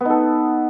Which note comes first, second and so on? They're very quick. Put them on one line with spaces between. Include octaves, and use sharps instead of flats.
B3 D#4 A4